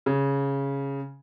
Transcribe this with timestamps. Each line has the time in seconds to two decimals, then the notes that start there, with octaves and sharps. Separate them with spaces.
0.06 C#3